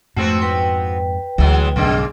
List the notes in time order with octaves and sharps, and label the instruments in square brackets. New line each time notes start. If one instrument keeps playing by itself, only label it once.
[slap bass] F2 G#2 [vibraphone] A3 [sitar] B3 C4 F#4
[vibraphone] B4 G5
[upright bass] D2 [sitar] E3 F#3 G#3
[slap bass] B1 G2 [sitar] C#3 G#3 A#3